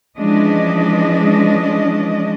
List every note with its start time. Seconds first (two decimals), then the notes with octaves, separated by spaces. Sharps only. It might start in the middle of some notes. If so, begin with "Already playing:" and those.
0.18 E3 F3 G#3 C#4 D4 D#5